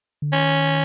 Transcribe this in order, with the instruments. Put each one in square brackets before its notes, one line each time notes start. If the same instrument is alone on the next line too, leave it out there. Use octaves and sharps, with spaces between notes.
[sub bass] D3
[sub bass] D#3 [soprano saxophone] C#4